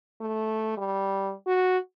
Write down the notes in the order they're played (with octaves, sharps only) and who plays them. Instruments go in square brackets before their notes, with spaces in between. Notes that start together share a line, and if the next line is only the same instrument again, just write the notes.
[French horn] A3
G3
F#4